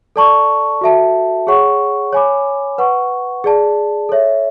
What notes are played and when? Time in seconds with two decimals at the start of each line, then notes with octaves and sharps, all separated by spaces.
0.16 A4 D5 A5 C#6
0.81 F#4 A4 E5 A5
1.47 G#4 C#5 F#5 C#6
2.13 C#5 G#5 B5 D6
2.78 B4 F#5 C#6
3.44 G#4 D5 A5
4.09 A4 C#5 E5